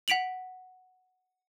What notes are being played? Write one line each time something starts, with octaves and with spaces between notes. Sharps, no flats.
F#5 B6 D7 F7 F#7